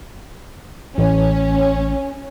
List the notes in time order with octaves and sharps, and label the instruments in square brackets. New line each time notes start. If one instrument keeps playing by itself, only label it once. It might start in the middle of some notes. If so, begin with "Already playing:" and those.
[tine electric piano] A1 [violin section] C#4